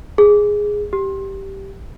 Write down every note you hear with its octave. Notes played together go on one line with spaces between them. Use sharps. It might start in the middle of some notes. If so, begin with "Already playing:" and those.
G#4
G4